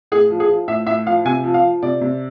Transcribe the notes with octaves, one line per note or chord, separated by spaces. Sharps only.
A2 G#4
F3
G#4
F3
A2 E5
A2 E5
F3 F5
C3 G#5
F3
F5
F3
C3 D5
C3